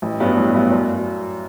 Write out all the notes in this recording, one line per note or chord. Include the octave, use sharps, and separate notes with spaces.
A1
G2 F#3 B3
A1
G2 F#3 B3
F#2